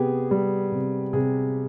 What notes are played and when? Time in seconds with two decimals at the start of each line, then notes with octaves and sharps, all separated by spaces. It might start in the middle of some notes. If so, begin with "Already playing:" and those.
Already playing: C3 B3 G4 G#4
0.31 G3
0.72 C3
1.13 C3 G#4